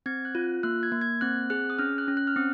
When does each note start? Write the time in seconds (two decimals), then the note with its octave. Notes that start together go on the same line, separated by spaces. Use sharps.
0.06 C4 G#6
0.25 F#6
0.35 F4
0.63 A#3 F#6
0.83 G#6
0.92 A#3
1.01 G#6
1.21 C4 F#6
1.50 G#4 F#6
1.70 D#6
1.79 C#4 F6
1.98 F#6
2.08 C#4
2.17 F#6
2.27 F6
2.36 C4 D#6